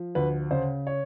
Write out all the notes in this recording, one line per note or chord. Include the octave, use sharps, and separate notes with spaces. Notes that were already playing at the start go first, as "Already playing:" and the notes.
Already playing: F3
D2 B4
C#3 C5
C#5